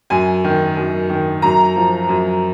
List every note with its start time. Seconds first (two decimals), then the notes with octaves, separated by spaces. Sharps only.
0.10 F#2 G#5
0.44 D#3
0.77 F#2
1.10 D#3
1.42 F#2 A#5
1.76 F3
2.09 F#2